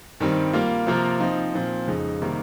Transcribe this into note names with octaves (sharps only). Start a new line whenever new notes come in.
G2 D#3 G3 C4
G3 A#3 F4
C3 F3 A#3 F4 A#4
F3 C4 D#4
A#2 F3 C4
F2 C#3 G#3 D#4
C3 D#3 G3 A#3